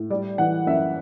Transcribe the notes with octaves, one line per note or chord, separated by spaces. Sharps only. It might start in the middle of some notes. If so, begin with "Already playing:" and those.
Already playing: A2
G3 D5
E3 F#5
F#2 E5